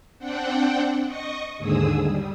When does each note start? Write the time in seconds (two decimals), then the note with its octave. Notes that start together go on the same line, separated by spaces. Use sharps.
0.19 C4 D4 F#5 G5
1.05 D#5 C#6 D#6
1.58 D#2 G#2 D3 G#4 D#6 E6
2.02 G3